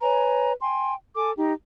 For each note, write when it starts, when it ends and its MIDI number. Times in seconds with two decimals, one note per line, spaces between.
0.01 0.52 71
0.01 0.52 73
0.01 0.52 80
0.01 0.52 82
0.61 0.94 79
0.61 0.94 80
0.61 0.94 84
1.15 1.31 69
1.15 1.31 80
1.15 1.31 86
1.36 1.53 63
1.36 1.53 67